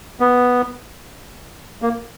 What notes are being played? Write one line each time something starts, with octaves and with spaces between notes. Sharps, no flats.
B3
A#3